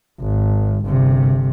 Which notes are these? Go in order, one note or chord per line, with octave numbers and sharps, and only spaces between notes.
G#1
G1 C3